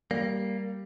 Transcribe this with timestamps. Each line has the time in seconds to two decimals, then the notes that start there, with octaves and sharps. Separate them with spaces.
0.11 G3 A#3